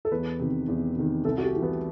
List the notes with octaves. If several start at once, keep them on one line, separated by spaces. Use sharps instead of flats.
A4
E2 B4
C3 D#3
E2
C3 D#3
C2 A4
F#4
G4
C3 E3
B3